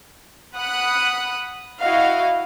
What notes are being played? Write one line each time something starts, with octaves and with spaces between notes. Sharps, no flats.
F#5 B5 D#6 F#6
E4 F#4 D#5 F5